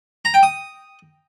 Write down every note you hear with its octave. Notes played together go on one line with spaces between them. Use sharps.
A#5
G5
D#6